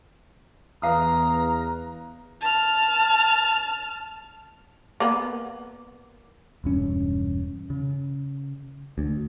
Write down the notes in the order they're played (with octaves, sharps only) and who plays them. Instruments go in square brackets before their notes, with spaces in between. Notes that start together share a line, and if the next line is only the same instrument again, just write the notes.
[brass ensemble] E2 [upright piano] B4 F5 D#6 [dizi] A#5
[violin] A5 F6
[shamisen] A#3 B3
[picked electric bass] E1 G2 C#4
C#3
D2